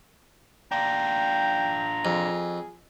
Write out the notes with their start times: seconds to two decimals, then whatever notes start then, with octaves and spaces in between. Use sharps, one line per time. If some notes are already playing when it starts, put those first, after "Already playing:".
0.72 D4 F4 G5 A#5
2.05 F2 G#4